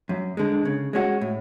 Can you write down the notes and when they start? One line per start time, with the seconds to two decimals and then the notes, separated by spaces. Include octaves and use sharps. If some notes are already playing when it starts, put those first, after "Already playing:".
0.09 F#2
0.37 D3 G#3
0.65 C#3
0.93 G#3 C#4 F#4
1.21 A2